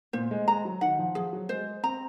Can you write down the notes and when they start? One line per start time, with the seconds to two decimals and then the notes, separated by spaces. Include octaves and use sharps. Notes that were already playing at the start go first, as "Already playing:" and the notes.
0.13 A#2 C5
0.31 G#3
0.48 G#3 A#5
0.65 F#3
0.81 D#3 F#5
0.99 F3
1.15 F3 G#4
1.33 F#3
1.49 G#3 C5
1.84 C4 A#5